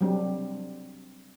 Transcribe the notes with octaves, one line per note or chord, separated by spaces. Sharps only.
F#3 G3 C4 D4